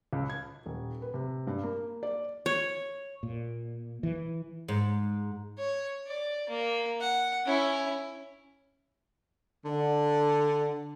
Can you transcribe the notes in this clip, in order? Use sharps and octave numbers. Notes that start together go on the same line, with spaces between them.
C#2
G#6
D#1
B4
C3
G2
A#3
D5
C#5
A#2
E3
G#2
C#5
D5
A#3
F#5
C#4 E4
D3